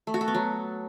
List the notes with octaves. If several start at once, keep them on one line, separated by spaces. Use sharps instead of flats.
A3
F#4
A4
B3
F#3